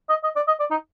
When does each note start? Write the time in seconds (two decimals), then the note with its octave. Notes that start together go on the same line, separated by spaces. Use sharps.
0.09 D#5
0.23 D#5
0.36 D5
0.47 D#5
0.59 D5
0.70 D#4